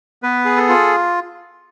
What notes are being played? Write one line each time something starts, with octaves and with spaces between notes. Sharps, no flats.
B3 B4
G#4
A4
F4